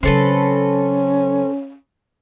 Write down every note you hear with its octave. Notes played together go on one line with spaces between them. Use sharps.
C#3 F#3 C4 C#4 A4 B4